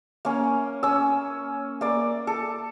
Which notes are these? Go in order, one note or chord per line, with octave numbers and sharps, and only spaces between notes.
A#3 C#4
C#4 E6
A#3 D5
A4